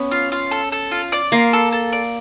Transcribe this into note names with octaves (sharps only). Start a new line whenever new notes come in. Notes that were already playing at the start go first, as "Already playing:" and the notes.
Already playing: B3 C#4
F4
F4
A4
A4
F4
D5
A#3 F4
A4
A4
D5